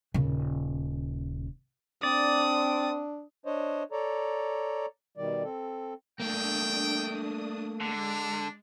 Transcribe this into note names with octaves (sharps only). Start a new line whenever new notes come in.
D#1 C#3
C4 D4 D5 D#6
D4 C5 C#5 D#5
A4 C#5 D5 A#5
B2 D#3 G3 D5
C4 A4
A3 A#3 D4 G5 D#6
D3 G#3 D4